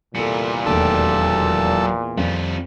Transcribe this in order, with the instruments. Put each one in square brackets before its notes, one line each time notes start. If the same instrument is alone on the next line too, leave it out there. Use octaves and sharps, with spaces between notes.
[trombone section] E2 A#2 [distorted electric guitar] G3 E4 [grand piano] A4 C#7
[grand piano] E1 D#2 A3 [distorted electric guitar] F#3 G4 [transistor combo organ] A4
[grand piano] F2 [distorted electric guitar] G3 F4